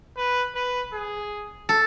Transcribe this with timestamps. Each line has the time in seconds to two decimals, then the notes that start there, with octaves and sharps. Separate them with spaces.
0.17 B4
0.55 B4
0.93 G#4
1.69 A4